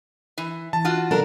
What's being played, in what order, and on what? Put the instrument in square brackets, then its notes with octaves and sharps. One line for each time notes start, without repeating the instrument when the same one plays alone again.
[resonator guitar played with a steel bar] E3
[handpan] E3 [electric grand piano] A5
[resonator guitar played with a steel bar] F4 F#4
[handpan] C3 F#3 G3 [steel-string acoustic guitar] D4 A4 A#4